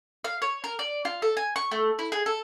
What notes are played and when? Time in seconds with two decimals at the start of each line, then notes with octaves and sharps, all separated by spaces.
0.24 F5
0.42 C#5
0.64 A#4
0.79 D5
1.05 F4
1.22 A4
1.37 G#5
1.56 C#6
1.71 A3
1.99 E4
2.12 G#4
2.26 A4